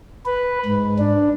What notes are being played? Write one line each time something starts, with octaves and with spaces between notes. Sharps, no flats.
B4
G#2
D4